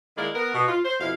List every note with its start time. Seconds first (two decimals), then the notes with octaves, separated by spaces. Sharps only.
0.17 D#3 G#3 A#3 E4 A#4 D5
0.35 B3 A#4
0.54 B2
0.68 F4
0.84 C5
1.00 F2 B2 E4 F5